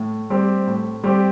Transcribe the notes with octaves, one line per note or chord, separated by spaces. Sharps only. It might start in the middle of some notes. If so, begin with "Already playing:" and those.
Already playing: A2
G3 C4 G4
A2
G3 C4 G4